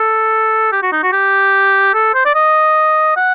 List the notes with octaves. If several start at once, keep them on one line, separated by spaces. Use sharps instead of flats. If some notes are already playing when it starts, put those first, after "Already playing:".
Already playing: A4
G4
F#4
D#4
F#4
G4
A4
C5
D5
D#5
F#5